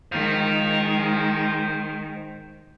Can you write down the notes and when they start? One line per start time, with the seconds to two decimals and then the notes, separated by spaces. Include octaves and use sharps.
0.12 D#3 G#3 C5 F5